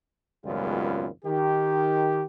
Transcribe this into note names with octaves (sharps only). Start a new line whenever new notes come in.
G#1 C#2 F#2 G3 B3 F4
D#3 G4